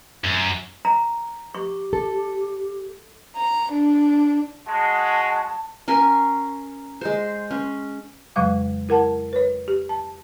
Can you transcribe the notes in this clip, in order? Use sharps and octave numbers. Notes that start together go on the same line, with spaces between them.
F#2
A#5
G4 C#6
A4
A#5
D4
G#3 F#4 A5
C#4 A#4 G#5 C6
G#3 C5
C#4
F2 C#3 F#3 G#3 F5 D6
E4 A#4 F#5 A5
B4 C#5
G4
A5